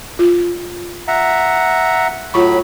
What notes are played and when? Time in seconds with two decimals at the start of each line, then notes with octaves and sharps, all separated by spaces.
0.19 F4
1.08 E5 F#5 A#5
2.34 A2 F#3 F4 B5 C#6